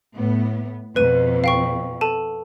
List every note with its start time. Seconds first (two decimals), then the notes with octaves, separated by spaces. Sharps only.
0.17 A2 B3
0.96 F2 B2 B4 D#7
1.44 F5 G5 C#6
2.01 A4 A5 D#7